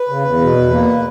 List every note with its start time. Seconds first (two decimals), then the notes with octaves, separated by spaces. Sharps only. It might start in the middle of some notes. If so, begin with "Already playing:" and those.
Already playing: B4
0.09 C#3
0.25 E2
0.41 B2
0.56 E2
0.72 A#3